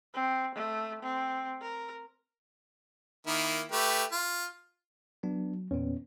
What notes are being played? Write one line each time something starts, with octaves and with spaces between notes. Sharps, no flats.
C4
A3
C4
A#4
D#3 A#3 E4
A3 G4 B4
F4
F#3 B3 D4
E2 A#2 B3 C#4